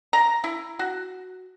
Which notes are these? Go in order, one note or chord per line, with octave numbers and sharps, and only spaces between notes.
A#5
E4
F#4